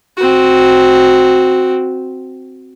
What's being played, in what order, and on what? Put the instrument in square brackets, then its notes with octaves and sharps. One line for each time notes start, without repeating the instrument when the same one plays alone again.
[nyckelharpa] C4 F#4